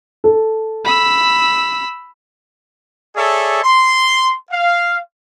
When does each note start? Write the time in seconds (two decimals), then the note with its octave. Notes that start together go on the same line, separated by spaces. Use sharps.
0.24 A4
0.85 B5 E6
3.16 G#4 A4 C#5 D5 E5
3.64 C6
4.51 F5